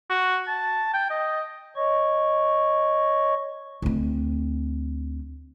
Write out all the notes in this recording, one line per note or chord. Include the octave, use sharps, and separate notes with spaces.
F#4
A5
G5
D#5
C#5 D#5 C#6
D2 C4